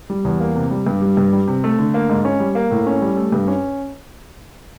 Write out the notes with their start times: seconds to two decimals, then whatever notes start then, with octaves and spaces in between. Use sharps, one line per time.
0.10 G3
0.25 E2
0.40 A#3
0.56 C3
0.71 G3
0.87 G2
1.02 G3
1.17 G2
1.33 G3
1.48 C3
1.64 A3
1.79 D3
1.94 A#3
2.10 G#2
2.25 C#4
2.40 G3
2.55 A#3
2.71 A2
2.87 C#4
3.02 G3
3.17 A3
3.32 G2
3.48 C#4